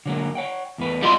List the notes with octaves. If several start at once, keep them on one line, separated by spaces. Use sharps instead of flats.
D3 F#3 A#3
C#5 F#5 G5
E2 A2 B4
G3 F4 F#4 D#5 C6